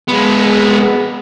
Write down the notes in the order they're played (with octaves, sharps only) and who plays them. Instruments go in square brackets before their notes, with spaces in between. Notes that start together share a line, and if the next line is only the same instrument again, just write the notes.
[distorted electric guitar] G#3 B3